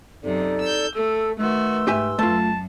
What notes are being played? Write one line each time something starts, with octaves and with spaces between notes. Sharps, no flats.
F#2 C3 D#4 A4 D5
E6 G6
A3 A4 E6
D#3 A3 F#4 B4 C6 E6
G#2 A3 G4 E5 G#5
F#2 A3 F4 A5